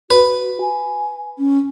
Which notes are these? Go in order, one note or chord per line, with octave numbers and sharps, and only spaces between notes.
F#4 B4
G#5
C#4